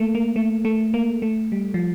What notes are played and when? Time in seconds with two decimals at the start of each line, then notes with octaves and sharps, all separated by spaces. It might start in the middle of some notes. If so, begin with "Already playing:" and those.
Already playing: A3 A#3
0.15 A#3
0.36 A3
0.65 A3
0.94 A#3
1.22 A3
1.52 G3
1.74 F3